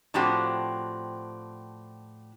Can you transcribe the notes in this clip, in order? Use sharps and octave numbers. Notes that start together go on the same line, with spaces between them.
A2 F3 C4 D4 F#4 G4